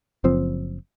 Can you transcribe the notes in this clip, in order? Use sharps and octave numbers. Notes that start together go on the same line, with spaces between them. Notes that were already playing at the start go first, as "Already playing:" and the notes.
F#1 F3 C4